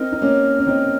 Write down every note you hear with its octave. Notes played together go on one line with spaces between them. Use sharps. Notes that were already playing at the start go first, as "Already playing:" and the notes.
Already playing: C4 D#4 A#4
D#4
A#3 C#4
C#4
C4 D#4